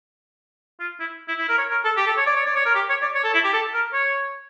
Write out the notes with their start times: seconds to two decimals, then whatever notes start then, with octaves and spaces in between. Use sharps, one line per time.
0.80 F4
1.00 E4
1.28 E4
1.38 E4
1.49 A#4
1.58 C#5
1.71 A#4
1.85 A4
1.97 G4
2.07 A4
2.17 C#5
2.27 D5
2.36 C#5
2.46 D5
2.56 C#5
2.66 A#4
2.75 G4
2.89 C#5
3.02 D5
3.15 C#5
3.24 A4
3.34 E4
3.44 G4
3.53 A4
3.74 A#4
3.93 C#5